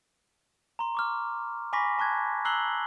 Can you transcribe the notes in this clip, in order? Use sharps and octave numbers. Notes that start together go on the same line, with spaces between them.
A#5 C6
C#6 D6 F6
G#5 B5 C#6 D6 A#6 B6
A5 C#6 F#6 G#6
A#5 E6 F#6 C7 F#7 G7